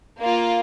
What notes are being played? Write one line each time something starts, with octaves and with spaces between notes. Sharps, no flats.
A#3 F4